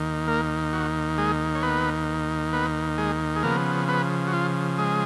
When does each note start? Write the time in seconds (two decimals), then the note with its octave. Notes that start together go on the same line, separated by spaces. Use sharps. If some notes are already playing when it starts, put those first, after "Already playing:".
Already playing: D#2 D#3
0.27 A#3 A#4
0.73 F#4
1.18 G#3 G#4
1.55 C#5
1.63 B3 B4
2.53 B3 B4
2.98 G#3 G#4
3.36 G#4
3.43 C#3 F3 A#3 B3 A#4
3.88 B3 B4
4.27 F#4
4.33 F4
4.78 G#3 G#4